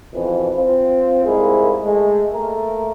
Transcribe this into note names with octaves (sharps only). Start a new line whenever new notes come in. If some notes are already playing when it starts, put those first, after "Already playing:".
F2 B2 E3
C4 F4
C2 G#2 G#3 A#3 E4 G#4
G#3 A3
A3 A#3 A#4